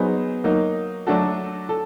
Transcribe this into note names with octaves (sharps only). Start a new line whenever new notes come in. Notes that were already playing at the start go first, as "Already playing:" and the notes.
Already playing: F#3 B3 D#4 G#4 C5
F#3 A#3 D#4
F#3 A3 D4 F#4 A4
A4